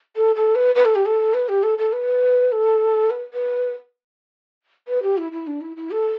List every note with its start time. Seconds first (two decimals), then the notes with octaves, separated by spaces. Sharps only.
0.16 A4
0.36 A4
0.55 B4
0.75 B4
0.85 A4
0.95 G4
1.06 A4
1.34 B4
1.49 G4
1.63 A4
1.78 A4
1.93 B4
2.52 A4
3.10 B4
3.34 B4
4.88 B4
5.03 G4
5.17 E4
5.32 E4
5.47 D4
5.61 E4
5.77 E4
5.91 A4